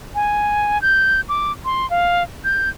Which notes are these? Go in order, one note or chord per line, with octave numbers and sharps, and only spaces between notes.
G#5
G6
D6
C6
F5
G6